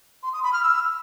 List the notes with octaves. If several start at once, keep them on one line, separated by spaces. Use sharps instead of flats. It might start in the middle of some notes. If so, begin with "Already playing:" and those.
C6
D#6
B5
F6
E6